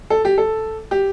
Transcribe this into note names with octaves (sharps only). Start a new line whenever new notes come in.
A4
G4
A4
G4